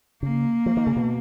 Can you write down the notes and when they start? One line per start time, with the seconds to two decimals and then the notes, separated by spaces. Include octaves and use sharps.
0.23 C#3 A#3
0.66 F3
0.77 D#3
0.87 C#3
0.96 B2